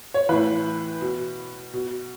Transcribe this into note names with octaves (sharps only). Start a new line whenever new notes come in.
C#5
A2 E3 B4
B2
B2